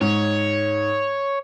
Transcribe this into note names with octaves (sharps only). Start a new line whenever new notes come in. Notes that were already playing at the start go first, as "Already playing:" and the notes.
G#2 C#5